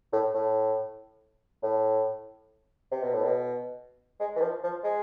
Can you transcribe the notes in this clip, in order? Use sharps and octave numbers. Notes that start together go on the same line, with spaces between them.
A2
A2
A2
C3
B2
A2
B2
G#3
E3
F3
F3
G#3